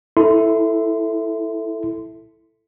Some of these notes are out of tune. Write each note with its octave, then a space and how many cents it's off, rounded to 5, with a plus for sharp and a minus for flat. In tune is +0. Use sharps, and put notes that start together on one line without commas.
E4 +0 A4 +0 C6 -20